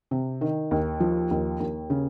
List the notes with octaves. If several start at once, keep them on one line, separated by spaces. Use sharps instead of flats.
C3
D#3
D#2
F3
D#2
D#2
C#3